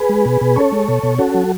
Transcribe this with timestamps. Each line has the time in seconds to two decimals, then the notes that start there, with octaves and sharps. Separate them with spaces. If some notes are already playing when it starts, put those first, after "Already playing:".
Already playing: G#4 B4
0.09 G#3
0.25 B2
0.41 B2
0.56 C#4 A4 C#5
0.72 G#3
0.88 B2
1.03 B2
1.19 C#4 F#4 A4
1.34 F#3